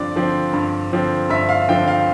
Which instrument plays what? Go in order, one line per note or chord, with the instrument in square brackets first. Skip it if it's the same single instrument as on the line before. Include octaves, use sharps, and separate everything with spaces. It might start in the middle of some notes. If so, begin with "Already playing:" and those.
Already playing: [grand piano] G2 D3 F3 C4 D5
D3 F3 C4
G2
D3 F3 C4
G2 E5
F5
D3 F3 C4 G5
F5